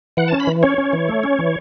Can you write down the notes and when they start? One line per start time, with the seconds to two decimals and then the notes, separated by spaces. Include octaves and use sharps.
0.17 E3 F#5
0.28 C#4 A5
0.40 B5
0.47 E3
0.63 C#4 C#5
0.78 C#4
0.93 E3
1.08 A3
1.23 C#4
1.39 E3